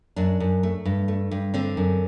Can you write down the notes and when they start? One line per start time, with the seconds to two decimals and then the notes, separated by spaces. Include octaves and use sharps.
0.16 F#2 D4
0.40 F#2
0.63 A3
0.85 G2
1.08 A3
1.31 G2
1.54 D3 C4
1.77 F#2